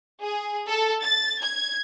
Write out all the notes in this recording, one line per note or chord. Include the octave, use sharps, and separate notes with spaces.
G#4
A4
A6
G#6